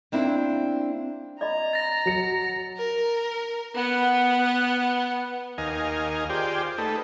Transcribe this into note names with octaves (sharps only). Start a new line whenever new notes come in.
A#3 C4 D4 E4
D5 D#5 A#5 B5
A6 A#6
F#3 C#7
A#4
B3 F#5
D#2 A#4 D#5 F5 G#5
F4 G4 G#4 C5 D5 G5
A3 D#4 A4 B4